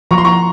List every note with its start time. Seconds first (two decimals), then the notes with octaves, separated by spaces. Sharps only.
0.11 F3 A#5 C#6
0.18 C6
0.25 A#5 C#6